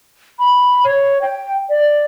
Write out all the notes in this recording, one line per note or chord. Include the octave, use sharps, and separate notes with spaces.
B5
C#5
G5
D5